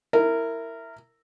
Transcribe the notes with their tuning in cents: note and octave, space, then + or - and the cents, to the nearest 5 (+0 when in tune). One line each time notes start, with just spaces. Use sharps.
E4 +0 A#4 -20